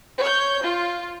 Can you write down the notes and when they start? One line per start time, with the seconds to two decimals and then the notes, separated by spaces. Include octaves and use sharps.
0.19 C#5 G6
0.61 F4